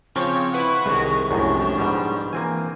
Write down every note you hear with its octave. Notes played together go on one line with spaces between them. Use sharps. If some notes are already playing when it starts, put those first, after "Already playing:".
C#3 F3 C4 C#5 C#6
E4 B4 F#5
C2 D#3 G#3
C2 F#2 A2 F3 D4
G#2 B2 G3
E3 A#3 C4 G#5